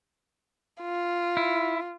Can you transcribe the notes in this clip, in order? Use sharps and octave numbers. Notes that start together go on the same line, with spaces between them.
F4
E4